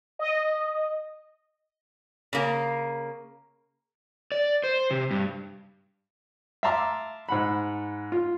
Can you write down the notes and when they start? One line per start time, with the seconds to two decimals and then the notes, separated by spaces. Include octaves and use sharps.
0.19 D#5
2.33 C#3 A#3
4.32 D5
4.64 C5
4.91 C3
5.11 G2
6.63 E5 F5 A5 A#5 C6 D6
7.29 G#2 F#5 B5
8.12 F4